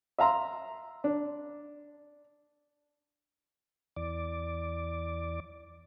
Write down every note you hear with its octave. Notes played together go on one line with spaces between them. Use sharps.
E5 F5 A#5 C6
D4
E2 D5